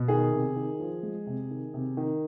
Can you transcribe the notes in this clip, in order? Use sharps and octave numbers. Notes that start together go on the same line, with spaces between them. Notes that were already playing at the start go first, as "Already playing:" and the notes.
Already playing: B2
D#3 G#4
C3
D#3
F3
G#3
C3
D#3
C3
D#3